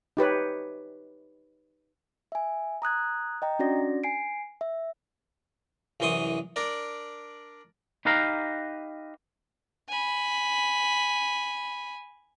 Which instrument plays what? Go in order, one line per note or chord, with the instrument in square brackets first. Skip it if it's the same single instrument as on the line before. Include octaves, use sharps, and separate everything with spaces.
[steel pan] D#4 G4 B4 C#5
[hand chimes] E5 G#5
A#5 D#6 F#6 G#6
D#5 G5 A#5
C#4 D4 F#4 D5 A#6
G#5 C7 D7
E5
[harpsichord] C2 F#2 E3 C6 C#6 D#6
D4 A#4 D5
[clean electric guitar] D#4 G4 B4 F5 A#5
[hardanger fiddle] G#5 B5